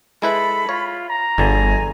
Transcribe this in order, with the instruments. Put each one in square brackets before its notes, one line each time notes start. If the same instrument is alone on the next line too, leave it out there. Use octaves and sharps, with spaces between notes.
[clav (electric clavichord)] G#3 E4 B4 [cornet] A4 [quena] B5
[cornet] F4 [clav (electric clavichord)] C#5
[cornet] A#5
[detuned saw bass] G1 [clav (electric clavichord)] E2 D3 [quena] G#5